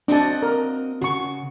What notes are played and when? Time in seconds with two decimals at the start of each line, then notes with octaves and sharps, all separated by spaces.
0.08 C4 D4 F#4 D#5 A5
0.43 A#4
1.02 C#3 F#4 C#6